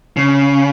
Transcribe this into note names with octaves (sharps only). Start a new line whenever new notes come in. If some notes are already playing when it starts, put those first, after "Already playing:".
C#3